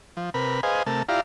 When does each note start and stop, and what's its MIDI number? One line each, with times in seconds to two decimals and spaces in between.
0.17 0.30 53
0.34 0.61 48
0.34 0.61 70
0.34 0.61 71
0.34 0.61 83
0.63 0.83 68
0.63 0.83 71
0.63 0.83 72
0.63 0.83 75
0.63 0.83 77
0.63 0.83 80
0.86 1.03 48
0.86 1.03 57
0.86 1.03 70
0.86 1.03 81
1.09 1.21 64
1.09 1.21 65
1.09 1.21 67
1.09 1.21 74
1.09 1.21 77
1.09 1.21 82